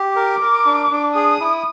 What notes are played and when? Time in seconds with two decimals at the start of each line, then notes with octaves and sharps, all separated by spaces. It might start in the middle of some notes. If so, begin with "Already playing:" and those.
Already playing: G4
0.15 A#4 D6
0.41 A#4
0.66 D4
0.90 D4
1.15 G#4 D#6
1.40 E4